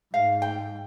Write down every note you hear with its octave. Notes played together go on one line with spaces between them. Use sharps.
G#2 F5
G5